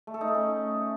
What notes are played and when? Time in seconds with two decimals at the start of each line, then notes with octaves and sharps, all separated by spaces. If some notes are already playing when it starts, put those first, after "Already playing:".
0.07 A3
0.14 A4
0.21 D#4
0.28 A3
0.35 C#4